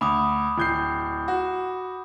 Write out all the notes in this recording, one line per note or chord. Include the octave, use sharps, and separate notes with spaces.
D2 B5 D6 D#6
D1 G6 C7
F#4